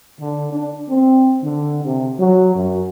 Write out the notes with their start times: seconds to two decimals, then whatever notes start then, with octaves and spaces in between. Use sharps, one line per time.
0.20 D3
0.52 D4
0.89 C4
1.42 D3
1.84 C3
2.19 F#3
2.55 F#2